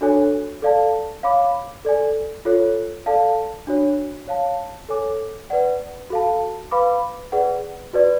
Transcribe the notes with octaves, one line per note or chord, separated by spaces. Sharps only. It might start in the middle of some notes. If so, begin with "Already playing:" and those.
D4 F#4 A4 C#5 G#5
A4 D5 F5 A5
C#5 F5 B5 D6
A4 D5 G#5
F4 A4 C#5
A4 D5 F5 A5
D4 F#4 C#5
C#5 F5 A5
A4 C#5 G#5 D6
B4 D5 F#5
F#4 A4 F5 A5
B4 F5 B5 D6
G#4 B4 D5 F#5
F#4 B4 D5